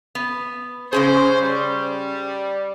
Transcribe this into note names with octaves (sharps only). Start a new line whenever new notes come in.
B3
C#3 C#4 G#4 C5
G3